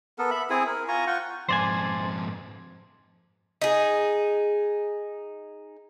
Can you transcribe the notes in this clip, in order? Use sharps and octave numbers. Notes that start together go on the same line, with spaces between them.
B3 A4 A#4
E5 B5
C4 E4 G#4 G#5
A#4
F4 G#5 A#5 C#6
F4 F#5 G5 C#6
F2 G#2 C5 D5 G#5
D#4 G#4